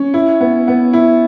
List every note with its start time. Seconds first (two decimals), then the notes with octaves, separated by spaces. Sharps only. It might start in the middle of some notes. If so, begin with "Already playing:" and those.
Already playing: C#4
0.14 E4
0.40 B3
0.68 B3
0.93 E4